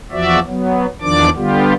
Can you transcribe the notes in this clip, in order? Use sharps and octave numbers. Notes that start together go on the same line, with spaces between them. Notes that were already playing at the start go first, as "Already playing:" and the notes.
E2 F3 F#4 D5 E5
F#3 B3
E2 D#3 F3 D4 D5 D6
D3 G3 B3 F4 G4